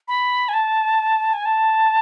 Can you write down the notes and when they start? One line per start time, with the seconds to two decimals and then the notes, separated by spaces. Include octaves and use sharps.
0.08 B5
0.49 G#5
0.54 A5
1.33 G#5
1.45 A5